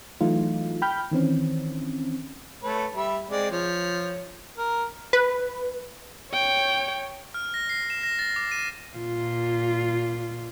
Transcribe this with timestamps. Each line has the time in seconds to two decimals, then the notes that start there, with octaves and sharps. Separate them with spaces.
0.21 E3 F#3 A3 D#4 F4
0.82 G5 B5 F6 G6
1.11 D#3 E3 C4 C#4
2.63 A3 B4 C#5
2.95 G3 E5 B5
3.30 G#3 C4 D5
3.51 F3 C#5
4.58 A#4
5.13 B4
6.32 C#5 G5
7.34 F6
7.54 A#6
7.69 C7
7.90 E7
8.03 A#6
8.19 A6
8.36 D6
8.51 D#7
8.97 A#2 F4